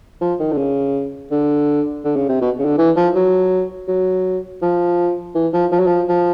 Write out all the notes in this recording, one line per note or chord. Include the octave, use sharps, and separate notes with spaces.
F3
D#3
D3
C#3
D3
D3
C#3
C3
B2
C#3
D3
E3
F3
F#3
F#3
F3
E3
F3
F3
F#3
F3
F3